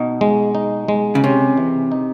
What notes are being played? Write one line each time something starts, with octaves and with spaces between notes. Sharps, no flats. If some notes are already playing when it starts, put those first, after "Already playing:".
Already playing: B2 D#4
G#3
D#4
G#3
C#3
C3 C#4
E3
D#4